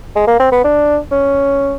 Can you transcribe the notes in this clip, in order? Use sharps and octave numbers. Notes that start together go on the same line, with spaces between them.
G#3
A#3
C4
B3
D4
C#4